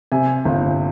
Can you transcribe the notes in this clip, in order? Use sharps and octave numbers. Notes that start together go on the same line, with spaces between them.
C3 G#5
G1